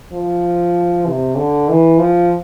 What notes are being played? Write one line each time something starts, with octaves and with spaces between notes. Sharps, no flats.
F3
C3
D3
E3
F3